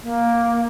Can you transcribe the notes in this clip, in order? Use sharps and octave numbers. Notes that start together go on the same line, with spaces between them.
A#3